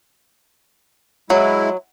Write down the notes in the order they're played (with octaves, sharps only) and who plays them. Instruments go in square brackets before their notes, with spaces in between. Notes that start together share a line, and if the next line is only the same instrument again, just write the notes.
[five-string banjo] F#3 [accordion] G#3 E4